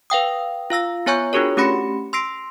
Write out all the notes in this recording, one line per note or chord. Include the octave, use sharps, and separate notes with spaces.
B4 F5 G5 D#6
F4 F5 E6 A#6
B3 F4 C#5 G#5 C#6 G6
D4 F4 F#4 G#4 A#4 C#5
A3 C#4 G4 B5 A#6 C#7
C6 E6 A#6 C7 D7